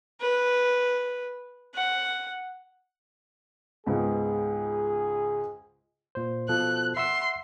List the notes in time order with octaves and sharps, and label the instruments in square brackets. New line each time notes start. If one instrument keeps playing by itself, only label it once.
[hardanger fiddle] B4
F#5
[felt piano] C#2 G#2 B3 [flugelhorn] G#4
[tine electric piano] A#2 C5
[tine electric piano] B2 F3 A4 [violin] F#6
[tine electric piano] E5 F#5 E6 [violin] C6